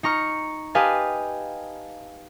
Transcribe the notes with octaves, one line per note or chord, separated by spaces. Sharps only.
D#4 A#5 C#6 F6
G4 B4 D#5 F5 G#5 A5